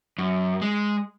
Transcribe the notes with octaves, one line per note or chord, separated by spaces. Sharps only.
F#2
G#3